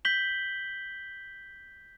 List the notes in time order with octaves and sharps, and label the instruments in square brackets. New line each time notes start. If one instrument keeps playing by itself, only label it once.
[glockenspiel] G6 B6 F#7 G7